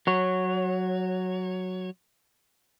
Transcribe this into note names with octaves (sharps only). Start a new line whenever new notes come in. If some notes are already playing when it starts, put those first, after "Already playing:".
F#3 C#5